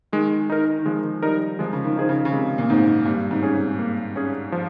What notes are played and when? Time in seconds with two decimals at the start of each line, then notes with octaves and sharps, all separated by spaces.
0.13 D#3 G#3
0.50 D#4 A#4
0.79 D#3
0.86 F3 G#3
1.23 G3 D#4 A#4
1.59 F3 G#3
1.73 C#3
1.84 D#3
1.96 D#3 D#4 G#4 C5
2.09 C#3
2.25 C#3
2.33 C3 G#3
2.58 A#2
2.70 G#2 D#4 G#4 C5
3.06 G2 A#3
3.31 G#2
3.43 C#4 G#4
3.55 C3
3.79 A#3
4.16 C#4 G#4
4.52 F3